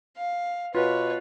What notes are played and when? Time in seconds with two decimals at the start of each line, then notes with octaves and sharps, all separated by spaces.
0.17 F5
0.75 B2 F4 B4 C#5